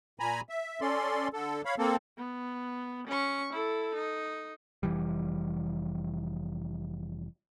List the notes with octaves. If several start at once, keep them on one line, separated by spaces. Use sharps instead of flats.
A#2 G#5 A#5 B5
E5
C#4 A4 D5 C6
D3 A4
C#5 F5 B5
A#3 C4 A4
B3
C#4 C#6
E4 A4
D#4
F1 E3 G3